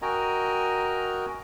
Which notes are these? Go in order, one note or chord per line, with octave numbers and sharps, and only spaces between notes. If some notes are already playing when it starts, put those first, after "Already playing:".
F#4 A#4 D#5 G5 G#5 A#5